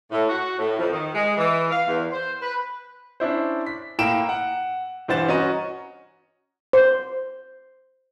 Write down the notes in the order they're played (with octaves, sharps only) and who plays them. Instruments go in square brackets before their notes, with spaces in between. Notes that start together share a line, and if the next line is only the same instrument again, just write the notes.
[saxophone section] A2
F#4
A2
F2
D#3
G#3
E3
F5
E2
C5
B4
[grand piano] C#4 D4 E4 C5
B6
A2 A#3 A#4 G5 D7 E7
F#5
G2 E3 C5 F#5 A6 E7
C#4 F#4 D#5 A#5 D#7
[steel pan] C5